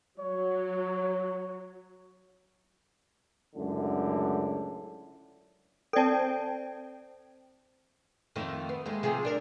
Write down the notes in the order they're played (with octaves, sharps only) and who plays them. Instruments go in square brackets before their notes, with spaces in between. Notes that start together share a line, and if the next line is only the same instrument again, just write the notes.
[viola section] F#3 [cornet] C#5
[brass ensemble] C#2 F#2 A2 D3
[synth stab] C4 G5 [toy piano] A4 D5 A5
[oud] F2 D#3 A3
B3
D#2 G#3 A3
C3 F3 G#4
D4 A#4